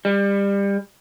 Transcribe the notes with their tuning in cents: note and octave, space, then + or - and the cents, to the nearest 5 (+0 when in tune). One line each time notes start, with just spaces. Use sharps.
G3 +25